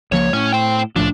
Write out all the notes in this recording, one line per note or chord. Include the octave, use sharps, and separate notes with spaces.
C#2 F3 A#3 C#5
A2 C#4
C5 G5
C2 A2 F3 D4